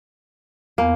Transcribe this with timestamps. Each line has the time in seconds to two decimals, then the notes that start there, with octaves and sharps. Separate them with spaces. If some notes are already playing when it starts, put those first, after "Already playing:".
0.78 E2 A#3 B3